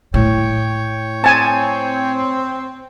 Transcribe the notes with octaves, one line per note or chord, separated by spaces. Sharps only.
A2 C#5 G5
C4 G#5 A5